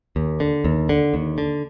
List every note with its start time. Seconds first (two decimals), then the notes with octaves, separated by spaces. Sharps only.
0.16 D#2
0.40 D3
0.65 D#2
0.89 D3
1.14 D#2
1.38 D3